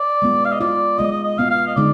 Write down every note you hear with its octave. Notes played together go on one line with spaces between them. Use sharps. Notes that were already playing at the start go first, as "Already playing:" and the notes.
Already playing: D5
G#3 B3 F4
F5
D#5
G#3 B3 F4 D5
G#3 B3 F4 D#5
D#5
D#5
G#3 B3 F4 F5
F5
D#5
D3 G#3 B3 D#4 D5